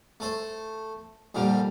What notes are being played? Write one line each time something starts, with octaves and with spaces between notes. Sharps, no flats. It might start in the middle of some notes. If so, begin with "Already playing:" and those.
A3 A4 C5
F2 A#2 D3 G3